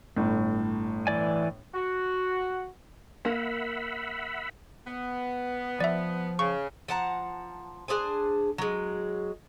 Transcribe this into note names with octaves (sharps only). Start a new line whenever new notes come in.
G1 A2
E3 D5 G#5
F#4
A#3 A#4 E5 F#5 B5
B3
F3 D5 E5
C#3 C#6
F3 F#5 A5 A#5
D4 G#4 C5 G#5
F#3 G#3